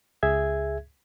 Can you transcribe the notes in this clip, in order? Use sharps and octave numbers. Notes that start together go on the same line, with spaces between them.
C#2 G#4 E5 G#6